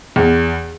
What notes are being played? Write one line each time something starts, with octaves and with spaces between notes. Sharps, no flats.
E2